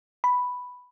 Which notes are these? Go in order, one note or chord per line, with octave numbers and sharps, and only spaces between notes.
B5